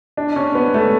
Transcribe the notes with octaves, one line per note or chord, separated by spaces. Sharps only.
D4
C#4
B3
A3